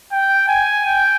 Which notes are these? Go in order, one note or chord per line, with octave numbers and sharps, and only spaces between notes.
G5
G#5
G5